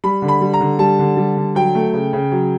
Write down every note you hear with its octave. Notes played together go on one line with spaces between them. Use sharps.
G3 B5
D3
B5
G3
A#5
D3
G3 A5
D3
G3
D3
F#3 G5
A3
C#3
C#3
F#3